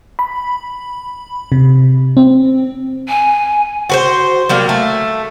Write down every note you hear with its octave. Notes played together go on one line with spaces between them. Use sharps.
B5
C3
C4
G#5
F#4 B4 C5
F#3 G3 A#3
A3